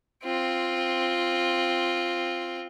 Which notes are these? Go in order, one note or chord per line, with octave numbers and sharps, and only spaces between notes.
C4 F4